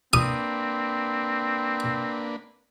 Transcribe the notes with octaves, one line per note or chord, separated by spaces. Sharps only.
A#3 C4 D4 B4 D#6